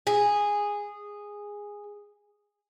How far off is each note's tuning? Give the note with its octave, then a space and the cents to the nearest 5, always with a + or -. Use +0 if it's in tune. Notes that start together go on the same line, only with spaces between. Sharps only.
G#4 -10